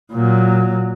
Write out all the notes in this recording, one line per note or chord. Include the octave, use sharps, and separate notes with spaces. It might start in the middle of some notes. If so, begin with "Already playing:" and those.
A#2 F#3